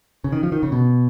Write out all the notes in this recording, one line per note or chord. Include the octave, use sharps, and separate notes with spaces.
C#3
D#3
F3
D#3
C#3
B2